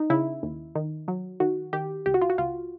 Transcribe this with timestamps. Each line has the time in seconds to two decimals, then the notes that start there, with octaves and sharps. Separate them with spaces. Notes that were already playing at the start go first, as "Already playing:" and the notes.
Already playing: D#4
0.10 C#3 E4
0.43 D#2
0.75 D#3
1.08 F#3
1.40 D#3 F#4
1.73 D#3 G4
2.06 C#2 G4
2.14 F#4
2.22 F4
2.30 F#4
2.38 C#2 F4